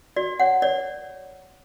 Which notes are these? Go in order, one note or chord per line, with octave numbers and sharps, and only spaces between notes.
F#4 D5
C#5 F#5
C#5 D5